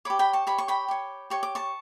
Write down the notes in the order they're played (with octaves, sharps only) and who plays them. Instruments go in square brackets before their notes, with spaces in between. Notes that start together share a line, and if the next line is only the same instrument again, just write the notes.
[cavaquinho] G4 C#5 B5 D6
G5 B5
A5 C#6
G4 C#5 B5
C#6
G5 B5
G4 C#5
G4 C#5 C#6
D6
A5 C#6